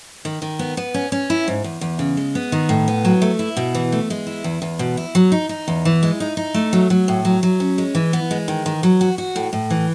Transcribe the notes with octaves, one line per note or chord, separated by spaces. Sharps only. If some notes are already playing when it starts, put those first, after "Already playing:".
D#3
D#3
B3
B3
C#4
C#4
E4
G#2
E2
E2
C#3
G#3
B3
D#3
A2
B3
F#3
A3
E4
B2
E3
A3
G#3
E4
E2
E2
B2
E4
F#3
D#4
D#4
E2
E3
G#3
D#4
D#4
A3
F#3
F#3
A2
F#3
F#3
C#4
G#3
E3
B3
G#3
D#3
D#3
F#3
F#4
F#4
A2
A2
E3